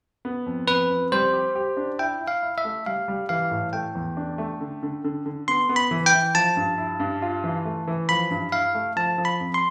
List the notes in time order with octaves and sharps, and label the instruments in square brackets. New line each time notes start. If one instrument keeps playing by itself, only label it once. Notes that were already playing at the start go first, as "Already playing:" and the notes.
[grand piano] B3
F2
[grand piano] F2 [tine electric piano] B4
[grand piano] F2
[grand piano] G3 [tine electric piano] C5
[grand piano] G4
G4
D4
[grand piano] E4 [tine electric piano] G5
[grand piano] E4
[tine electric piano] F5
[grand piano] E4
[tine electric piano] E5
[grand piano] A3
[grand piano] G3 [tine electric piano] F5
[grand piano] G3
[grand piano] E3 [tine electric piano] F5
[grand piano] A2
[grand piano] A3 [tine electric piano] G5
[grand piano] E2
D4
A3
D3
D3
D3
D3
[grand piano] B3 [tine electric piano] C6
[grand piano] B3
[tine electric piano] B5
[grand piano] E3
[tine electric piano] G5
[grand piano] E3
[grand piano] F3 [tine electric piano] A5
[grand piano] G2
E4
G2
F4
E3
A3
E3
[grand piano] F3 [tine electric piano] B5
[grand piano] G2
[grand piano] E4 [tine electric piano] F5
[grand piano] A3
[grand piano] F3 [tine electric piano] A5
[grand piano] F3
[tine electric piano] B5
[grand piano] F2
[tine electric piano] C6